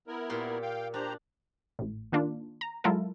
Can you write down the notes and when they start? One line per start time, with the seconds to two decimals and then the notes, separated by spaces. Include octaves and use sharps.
0.07 B3 E4 A#4
0.30 A#2 G4 C6
0.62 F5 G5
0.94 D4 G4 C5 A#5
1.79 A1 A2
2.12 D#3 A#3 D4 F4
2.61 A#5
2.84 F#3 G#3 E4 F4 A4 A#4